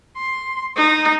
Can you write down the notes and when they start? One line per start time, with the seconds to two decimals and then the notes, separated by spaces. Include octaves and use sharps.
0.17 C6
0.76 D#4